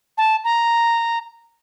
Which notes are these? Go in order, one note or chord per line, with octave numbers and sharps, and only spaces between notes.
A5
A#5